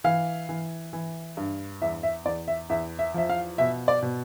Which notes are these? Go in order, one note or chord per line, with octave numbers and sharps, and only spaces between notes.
E3 F5
E3
E3
G2
E2 E5
E5
E2 D5
E5
E2 E5
E5
F3 E5
F5
B2 E5
D5
B2